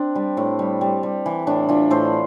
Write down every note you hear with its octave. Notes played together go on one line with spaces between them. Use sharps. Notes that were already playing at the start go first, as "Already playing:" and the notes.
Already playing: C4 D4
G3
A2
G3
G3
G3
E3
A2 D4
E3 D4 F4
A2 A4 C5